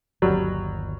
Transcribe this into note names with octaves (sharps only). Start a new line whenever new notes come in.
G1 D#2 F#3 G3